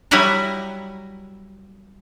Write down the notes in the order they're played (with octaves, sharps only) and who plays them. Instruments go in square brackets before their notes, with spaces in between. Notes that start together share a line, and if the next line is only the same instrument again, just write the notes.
[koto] F#3 G3 E4 F#5 G#5 A#5